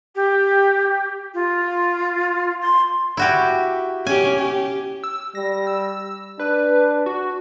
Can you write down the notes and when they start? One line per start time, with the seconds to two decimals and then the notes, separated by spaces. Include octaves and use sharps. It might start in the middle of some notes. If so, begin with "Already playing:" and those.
0.15 G4
1.34 F4
2.61 C6
3.17 E4 F#4 G4
4.07 C#4 G4 G#5
4.39 G4
5.04 E6
5.35 G3 A#6
5.67 E6
6.39 D4 B4
7.06 F#4